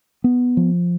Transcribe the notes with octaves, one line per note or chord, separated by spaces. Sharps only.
B3
F3